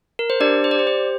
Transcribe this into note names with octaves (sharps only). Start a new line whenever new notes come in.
A#4
C5
D4 G4 D5
C5
D5
G4 C5
C5